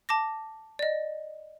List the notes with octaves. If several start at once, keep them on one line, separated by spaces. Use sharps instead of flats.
A5 D6 A#6
D5 D#5